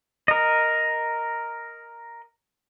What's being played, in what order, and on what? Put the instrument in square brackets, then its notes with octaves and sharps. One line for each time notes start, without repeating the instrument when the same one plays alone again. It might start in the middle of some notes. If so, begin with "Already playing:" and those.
[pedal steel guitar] A#4 D#5